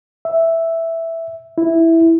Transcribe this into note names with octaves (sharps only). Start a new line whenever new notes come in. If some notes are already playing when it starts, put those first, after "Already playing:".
E5
E4